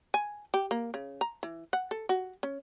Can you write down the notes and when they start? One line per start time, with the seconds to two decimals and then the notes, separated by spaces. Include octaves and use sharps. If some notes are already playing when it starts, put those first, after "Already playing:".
0.14 G#5
0.54 G4
0.71 A#3
0.94 C#3
1.21 A#5
1.43 E3
1.73 F#5
1.91 A4
2.09 F#4
2.43 C#4